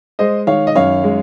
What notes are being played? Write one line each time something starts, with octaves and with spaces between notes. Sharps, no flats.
G#3 C5 D#5
D#3 C#5 F5
D#5
F#2 C#5 F5
G#3